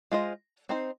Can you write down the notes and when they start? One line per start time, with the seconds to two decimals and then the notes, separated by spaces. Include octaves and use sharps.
0.12 G#3 F4 C5 D#5
0.69 C4 D#4 C5